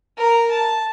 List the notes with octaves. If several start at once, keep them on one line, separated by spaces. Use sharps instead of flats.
A#4 A#5
A5